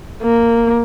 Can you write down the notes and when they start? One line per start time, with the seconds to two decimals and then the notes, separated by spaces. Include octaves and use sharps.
0.22 A#3